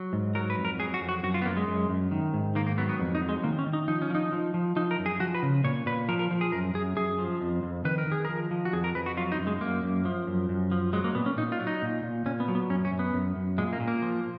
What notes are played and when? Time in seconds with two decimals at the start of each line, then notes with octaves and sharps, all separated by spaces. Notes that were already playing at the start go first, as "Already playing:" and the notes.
Already playing: F#3
0.13 G#2
0.35 F#3 A#4
0.50 B4
0.58 F2
0.65 A#4
0.79 F#3 G#4
0.94 F#4
1.01 F2
1.09 F#4
1.23 F#2 F#4
1.34 F4
1.42 B3
1.46 F#2 A#3
1.57 G#3
1.68 F#2
1.89 F#2
2.11 D#3
2.34 G#2
2.55 D#3 A#3
2.67 A#3
2.78 F#3 B3
2.89 B3
3.00 F2
3.15 D#4
3.22 F#3
3.29 G#3
3.44 D#3 A#3
3.59 C#4
3.66 D#3
3.73 D#4
3.88 F3 D#4
4.02 C#4
4.10 F3 D#4
4.32 F3
4.54 F3
4.76 F3 D#4
4.91 A#4
4.99 F#2
5.06 G#4
5.20 F3 F#4
5.35 B4
5.42 C#3
5.64 A#2 C#5
5.86 A#2 B4
6.09 F3 A#4
6.19 A#4
6.31 F3
6.41 G#4
6.52 F#2 A#4
6.74 F#2 G#4
6.97 F#2 G#4
7.18 F3
7.40 F2
7.63 F2
7.85 D#3 B4
7.98 A#4
8.07 D#3 G#4
8.25 F3 A#4
8.51 F3
8.65 F#4
8.73 F2 G#4
8.84 A#4
8.95 F2 B4
9.06 F#4
9.17 F#3 F4
9.32 D#4
9.39 F#2
9.47 G#3
9.61 F#2 A#3
9.83 F#2
10.05 F3
10.27 F#2
10.49 F#2
10.72 F3
10.93 F#3 G#3
11.04 A#3
11.15 A#2 B3
11.26 C#4
11.37 A#2 D#4
11.52 F4
11.59 F#3
11.67 D#4
11.82 A#2
12.03 A#2
12.26 A#2 C#4
12.40 B3
12.48 F#3
12.55 B3
12.70 F#2 C#4
12.85 C#4
12.91 F#2
12.99 B3
13.14 F#2
13.36 F#2
13.58 A#2 G#3
13.73 A#3
13.80 A#2
13.88 A#3
14.02 F3